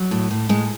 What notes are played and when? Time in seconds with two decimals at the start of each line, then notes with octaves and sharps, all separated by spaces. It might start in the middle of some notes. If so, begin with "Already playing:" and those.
Already playing: F#3
0.11 A2
0.31 A2
0.49 A2 G#3